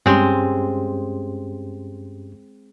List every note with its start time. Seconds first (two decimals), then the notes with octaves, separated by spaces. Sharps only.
0.06 G2 G#3 C4 C#4 G4